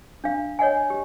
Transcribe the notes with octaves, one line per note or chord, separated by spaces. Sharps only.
D4 F5
C#5 D#5 F#5 G#5
G4